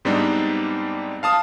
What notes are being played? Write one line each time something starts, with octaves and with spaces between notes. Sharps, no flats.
G#2 G3 B3 C4 D4 D#4
F5 A5 D#6